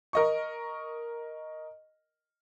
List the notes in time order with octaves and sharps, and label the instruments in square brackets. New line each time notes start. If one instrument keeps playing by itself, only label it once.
[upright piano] A#4 D#5 C#6